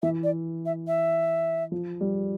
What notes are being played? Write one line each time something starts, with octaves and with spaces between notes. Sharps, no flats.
E3 E5
D5
E5
E5
F3
G3